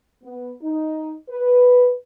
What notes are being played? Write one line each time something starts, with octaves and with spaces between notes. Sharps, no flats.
B3
D#4
B4